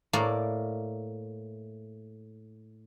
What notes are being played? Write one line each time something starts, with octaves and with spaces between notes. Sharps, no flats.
A2 A#3 A#4 D5